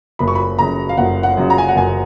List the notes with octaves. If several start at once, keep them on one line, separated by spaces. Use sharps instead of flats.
F#1 B5
C#6
B5
F#2 C#3 A#5
F5
F#1 F#5
F#5
F#2 C#3
A#5
G#5
F#5
F#1 G#5